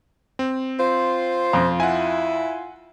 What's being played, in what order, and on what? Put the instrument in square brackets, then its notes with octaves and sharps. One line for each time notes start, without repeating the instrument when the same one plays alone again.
[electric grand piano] C4
[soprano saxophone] F4 [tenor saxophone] C5
[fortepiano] F2
[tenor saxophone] E4 [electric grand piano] F#5 G#5